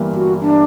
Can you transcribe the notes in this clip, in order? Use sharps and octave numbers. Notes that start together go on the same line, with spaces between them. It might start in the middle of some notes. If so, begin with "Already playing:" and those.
Already playing: G1 G2 E3 G3 A#3
F#4
D4